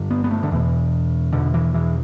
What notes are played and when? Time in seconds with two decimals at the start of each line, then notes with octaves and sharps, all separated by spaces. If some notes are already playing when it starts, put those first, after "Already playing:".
Already playing: G2 D3
0.11 B3
0.24 B3
0.31 A3
0.43 D3
0.51 E2 B2 E3
1.33 E2 B2 D3
1.54 E3
1.74 E3